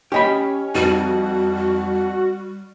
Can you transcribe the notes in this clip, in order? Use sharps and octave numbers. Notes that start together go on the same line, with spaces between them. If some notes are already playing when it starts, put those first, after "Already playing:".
C#4 G4 D#5 B5
F2 G3 D#4 F#4 D#7